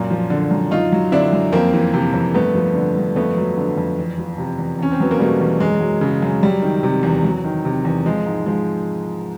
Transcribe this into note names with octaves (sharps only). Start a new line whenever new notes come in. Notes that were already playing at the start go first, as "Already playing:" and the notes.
Already playing: F#2 A#2
F3
D3
F#2
F#2 D#4 F4
F#3
D3 D4 E4
F#2
F2 A#3 C4
E3
C3
F2
G2 A3 B3
F3
D3
G2
F2 A3 B3
F#3
D3
F2
E2
F3
C3
E2
E2 C#4
C4
F#3 B3
A#3
B2 G3 A3
E2
F#2 G#3
F#3
C#3
F#2
F#3 G3
D#3
C3
E2
F#3
D#3
C3
E2
F3 G#3
G#2
F3 G#3